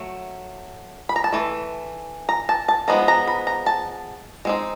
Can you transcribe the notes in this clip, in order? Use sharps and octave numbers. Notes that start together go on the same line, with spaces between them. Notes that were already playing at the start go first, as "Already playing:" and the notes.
Already playing: F#3 A3
B5
A#5
A5
E3 A3
A#5
A5
A5
F3 G#3 B3 D#4 A#5
A#5
B5
A#5
A5
G#3 C4 D#4